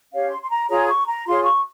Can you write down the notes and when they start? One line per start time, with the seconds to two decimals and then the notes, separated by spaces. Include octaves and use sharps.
0.12 C#4 G4 C#5 F5
0.31 C6
0.42 C6
0.51 A#5
0.69 F4 G#4 C#5 A#5
0.88 C#6
1.08 A#5
1.27 F4 G#4 C#5 C6
1.45 C#6